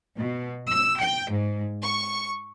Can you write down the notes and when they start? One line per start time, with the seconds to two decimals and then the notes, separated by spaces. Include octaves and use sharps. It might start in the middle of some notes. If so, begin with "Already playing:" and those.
0.16 B2
0.70 E6
0.99 G5
1.31 G#2
1.81 C#6